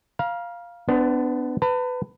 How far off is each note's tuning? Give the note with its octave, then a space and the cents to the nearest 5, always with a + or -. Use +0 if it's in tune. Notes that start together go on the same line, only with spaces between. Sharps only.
F5 +0 A#5 +40
B3 +20 D4 +0 C5 -25
B4 +20 A5 +45